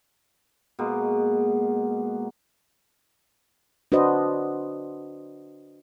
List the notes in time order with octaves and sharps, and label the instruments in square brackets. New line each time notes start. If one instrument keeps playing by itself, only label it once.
[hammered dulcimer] B2 G#3 A#3
[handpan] D4 F#4 B4 C5 D#5